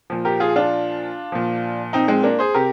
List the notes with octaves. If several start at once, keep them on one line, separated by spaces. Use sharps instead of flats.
A#2 F3
G4 A#4
F4 G#4
D4 F4
A#2 F3
C4 D#4
G#3 C4
A#3 D4
G#4 C5
C3 G4 A#4